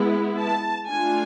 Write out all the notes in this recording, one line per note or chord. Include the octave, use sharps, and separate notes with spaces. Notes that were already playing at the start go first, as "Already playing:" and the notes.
Already playing: G#3 B3 E4
A5
A3 D4 F4 G#5